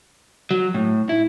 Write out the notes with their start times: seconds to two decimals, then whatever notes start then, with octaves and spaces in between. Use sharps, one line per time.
0.51 F#3
0.74 A2
1.09 E4